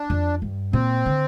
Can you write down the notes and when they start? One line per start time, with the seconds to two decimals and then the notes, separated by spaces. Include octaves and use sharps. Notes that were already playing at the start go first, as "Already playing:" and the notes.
Already playing: D4
0.10 F2
0.42 G2
0.73 A#2 C4
1.06 D3